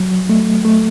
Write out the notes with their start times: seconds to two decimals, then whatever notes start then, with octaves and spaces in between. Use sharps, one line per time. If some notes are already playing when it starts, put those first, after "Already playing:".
Already playing: F#3
0.29 A3
0.65 A3